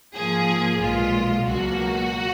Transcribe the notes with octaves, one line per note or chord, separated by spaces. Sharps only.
G#2 F3 A#3 G#4
B1 A#2 G#3 F4
C#2 B2 F#3 A#3 F#4